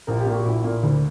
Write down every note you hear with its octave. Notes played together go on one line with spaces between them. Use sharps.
A#1 A#4
G4
A#2 A#3
F#4
A#1 E4
A#2 A#3
D2